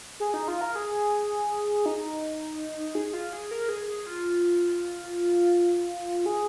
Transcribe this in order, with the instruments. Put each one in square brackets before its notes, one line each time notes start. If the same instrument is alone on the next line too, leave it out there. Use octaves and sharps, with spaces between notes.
[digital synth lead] G#4
D#4
F4
A#4
G#4
D#4
G#4
F4
G#4
A#4
G#4
G#4
F4
G#4